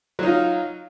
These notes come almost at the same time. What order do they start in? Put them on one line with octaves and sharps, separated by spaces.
F#3 D#4 F4